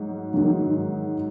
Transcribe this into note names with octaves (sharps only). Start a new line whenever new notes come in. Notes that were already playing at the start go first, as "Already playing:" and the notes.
Already playing: G#2 F#3
G#2 D#3 F#3